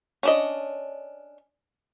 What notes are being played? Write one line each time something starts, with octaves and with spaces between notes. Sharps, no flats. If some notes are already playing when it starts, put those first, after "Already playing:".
C#4 D4 D#5